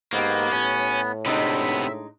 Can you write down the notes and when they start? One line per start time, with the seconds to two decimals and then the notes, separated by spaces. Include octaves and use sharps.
0.13 G#2 F#3 A#3 B3 G4
0.52 A2 C#4
1.26 C3 G#3 B3 D4 D#4 E5